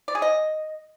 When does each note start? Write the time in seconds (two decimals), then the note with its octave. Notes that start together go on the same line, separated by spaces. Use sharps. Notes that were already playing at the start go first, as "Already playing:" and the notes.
0.08 D5
0.15 G#4
0.22 D#5